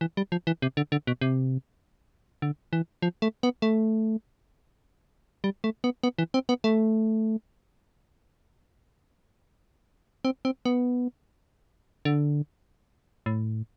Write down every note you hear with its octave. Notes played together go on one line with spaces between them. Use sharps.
E3
G3
F3
E3
C3
D3
D3
B2
C3
D3
E3
F3
A3
B3
A3
G3
A3
B3
B3
E3
C4
B3
A3
C4
C4
B3
D3
A2